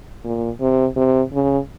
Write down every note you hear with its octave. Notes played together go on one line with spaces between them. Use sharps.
A#2
C3
C3
C#3